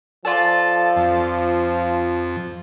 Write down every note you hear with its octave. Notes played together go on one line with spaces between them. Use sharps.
F3 F4 A4 D5 A5
F2